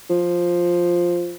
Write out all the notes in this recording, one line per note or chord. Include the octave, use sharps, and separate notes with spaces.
F3